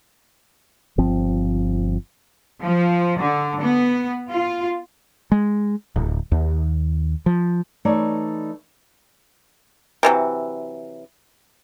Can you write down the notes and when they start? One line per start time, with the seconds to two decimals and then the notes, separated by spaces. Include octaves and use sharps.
0.98 G1 F3 C4
2.62 F3
3.20 D3
3.61 B3
4.29 F4
5.32 G#3
5.96 D1
6.32 D#2
7.26 F3
7.85 E3 A3 D#4 C#5 D5
10.03 C3 E3 F#3